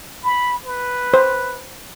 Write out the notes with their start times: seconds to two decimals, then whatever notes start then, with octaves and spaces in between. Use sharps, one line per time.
0.23 B5
0.66 B4
1.14 C5